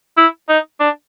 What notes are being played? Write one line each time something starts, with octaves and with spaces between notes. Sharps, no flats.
E4
D#4
D4